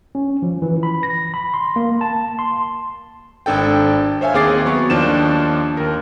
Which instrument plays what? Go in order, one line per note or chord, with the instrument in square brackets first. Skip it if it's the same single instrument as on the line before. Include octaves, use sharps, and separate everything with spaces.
[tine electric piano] C#4
F3
E3
B5
A#6
B5
C6
A#3
A5
C6
[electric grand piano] G#1 D4 A4 G5
C5 C#5 E5 F5 G#5
D#2 C4 G#4 D6 A6 C7
F#3 B3 C#6
D#2 F3 D4 E7
D#2 A#4